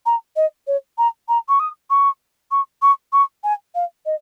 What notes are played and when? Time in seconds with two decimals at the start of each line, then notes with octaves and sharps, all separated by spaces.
0.06 A#5
0.36 D#5
0.67 C#5
0.98 A#5
1.28 A#5
1.49 C#6
1.59 D#6
1.90 C#6
2.51 C#6
2.82 C#6
3.12 C#6
3.44 G#5
3.75 F5
4.06 D#5